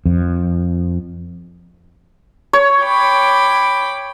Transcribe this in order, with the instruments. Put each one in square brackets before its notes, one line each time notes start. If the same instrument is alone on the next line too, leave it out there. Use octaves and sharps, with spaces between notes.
[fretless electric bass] F2
[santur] C#5
[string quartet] G5 B5 D6